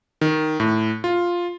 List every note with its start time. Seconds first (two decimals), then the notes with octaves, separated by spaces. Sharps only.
0.21 D#3
0.60 A2
1.04 F4